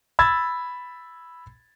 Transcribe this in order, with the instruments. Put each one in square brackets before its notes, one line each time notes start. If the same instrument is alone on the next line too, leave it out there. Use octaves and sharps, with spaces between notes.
[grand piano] B5 E6 G#6 A6